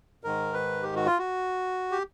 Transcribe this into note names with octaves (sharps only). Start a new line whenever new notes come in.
G#2 D#3 A#4
B4
G4
F#4
F4
F#4
G4